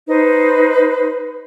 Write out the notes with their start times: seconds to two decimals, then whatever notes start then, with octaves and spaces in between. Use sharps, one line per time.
0.07 D#4 B4 C5